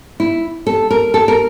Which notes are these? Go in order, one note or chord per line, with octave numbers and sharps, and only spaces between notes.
E4
A4
A#4
A4
A#4